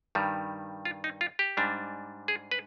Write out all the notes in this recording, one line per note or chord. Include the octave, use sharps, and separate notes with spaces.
G2 D#3 G3
F4
D#4
F4
G4
G#2 G3 D4
G#4
B4